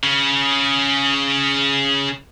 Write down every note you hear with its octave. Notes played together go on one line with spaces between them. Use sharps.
C#3 C#4